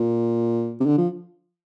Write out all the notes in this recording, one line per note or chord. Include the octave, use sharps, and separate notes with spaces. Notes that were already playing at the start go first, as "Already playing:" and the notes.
Already playing: A#2
C3
D3
F3